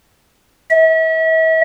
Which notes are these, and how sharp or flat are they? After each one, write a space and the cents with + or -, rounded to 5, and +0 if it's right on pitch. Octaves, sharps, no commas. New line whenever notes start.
E5 -40